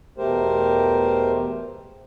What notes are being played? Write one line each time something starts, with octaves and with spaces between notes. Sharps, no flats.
E2 B2 A3 G4 A#4 C5